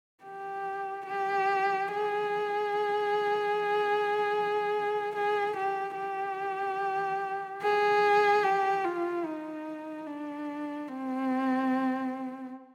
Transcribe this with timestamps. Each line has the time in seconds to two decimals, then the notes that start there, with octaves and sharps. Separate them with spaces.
0.24 G4
1.06 G4
1.88 G#4
5.15 G#4
5.56 G4
5.97 G4
7.62 G#4
8.43 G4
8.84 F4
9.25 D#4
10.07 D4
10.88 C4